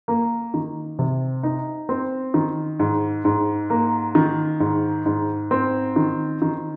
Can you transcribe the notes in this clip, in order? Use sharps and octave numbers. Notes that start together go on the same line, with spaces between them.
A#3
D#3
C3
D#4
C4
D#3
G#2
G#2
A#3
D#3
G#2
G#2
C4
D#3
D#3